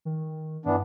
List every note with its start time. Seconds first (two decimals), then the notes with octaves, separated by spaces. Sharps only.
0.05 D#3
0.66 G2 E3 B3 D4